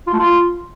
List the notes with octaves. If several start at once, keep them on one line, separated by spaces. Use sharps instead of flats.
F4
A3
F4